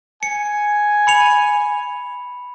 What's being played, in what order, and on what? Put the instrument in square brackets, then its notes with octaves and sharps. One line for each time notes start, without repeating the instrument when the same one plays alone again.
[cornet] G#5 [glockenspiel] C#7
[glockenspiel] B5 C#7 F7